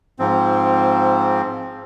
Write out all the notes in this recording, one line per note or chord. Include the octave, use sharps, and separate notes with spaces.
G#2 F3 C4